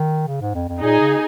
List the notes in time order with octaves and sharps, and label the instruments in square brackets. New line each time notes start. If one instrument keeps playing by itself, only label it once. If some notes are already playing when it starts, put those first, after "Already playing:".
Already playing: [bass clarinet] D#3
C#3
G#2
F2
F2
[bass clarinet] A#2 [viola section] D#4 G#4
[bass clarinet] C#3